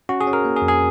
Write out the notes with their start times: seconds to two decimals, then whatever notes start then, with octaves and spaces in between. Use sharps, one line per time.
0.09 C#4 F#4
0.21 G#4
0.27 C#4
0.33 A#4
0.45 A#3
0.56 G#4
0.62 F2
0.68 G#4